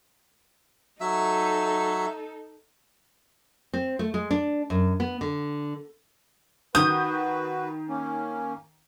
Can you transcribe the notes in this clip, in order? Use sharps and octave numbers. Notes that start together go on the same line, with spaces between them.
F#3 D#4 A4 E5
C4
A3
G#3
D4
F#2
B3
D3
D#3 F#4 B4 D#6 G6
A#3 C#4